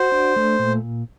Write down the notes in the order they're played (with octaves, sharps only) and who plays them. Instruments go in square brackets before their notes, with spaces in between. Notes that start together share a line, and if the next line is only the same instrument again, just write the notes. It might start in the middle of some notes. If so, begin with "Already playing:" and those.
Already playing: [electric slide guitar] F#4 [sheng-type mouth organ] C5
[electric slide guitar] D4
A3
A#2